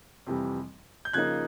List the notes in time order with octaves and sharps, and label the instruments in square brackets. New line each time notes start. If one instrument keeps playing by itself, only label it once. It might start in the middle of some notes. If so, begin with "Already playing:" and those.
[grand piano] F2 C3 E3 G3
G6
C#3 F3 A#3 D#4 F#6 G#6